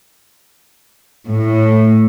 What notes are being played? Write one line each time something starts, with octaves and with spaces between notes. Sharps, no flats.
A2